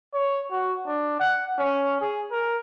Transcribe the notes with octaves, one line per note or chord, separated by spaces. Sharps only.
C#5
F#4
D4
F#5
C#4
G#4
A#4